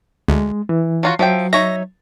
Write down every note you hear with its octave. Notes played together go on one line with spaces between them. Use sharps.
D2 G#3
E3
F#3 F4 F#4
F3 F#3 E5 G5
D#4 C#5 E5 A#6